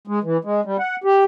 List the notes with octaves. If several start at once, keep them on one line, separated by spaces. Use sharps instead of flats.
G#3
E3
G#3
G3
F#5
G4